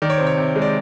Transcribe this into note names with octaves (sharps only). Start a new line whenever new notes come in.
D#3 D5
C#5
C3 C5
C#5
C3
G#3
D5